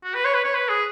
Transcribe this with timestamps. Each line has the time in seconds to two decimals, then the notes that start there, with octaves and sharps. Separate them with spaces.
0.04 F#4
0.14 B4
0.24 C#5
0.34 B4
0.44 C#5
0.54 B4
0.68 G#4